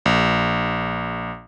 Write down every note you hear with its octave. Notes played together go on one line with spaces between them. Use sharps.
A#1